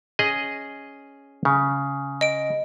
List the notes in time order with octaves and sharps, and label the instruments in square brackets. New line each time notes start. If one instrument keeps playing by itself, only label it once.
[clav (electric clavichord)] C#4 G#4 D#5
C#3
[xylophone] D#5 D7